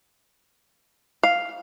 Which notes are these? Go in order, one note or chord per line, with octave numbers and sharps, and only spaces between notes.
F5